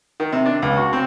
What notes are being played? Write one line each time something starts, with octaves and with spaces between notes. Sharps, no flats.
D#3
C3
D4
C#2
F#4
C4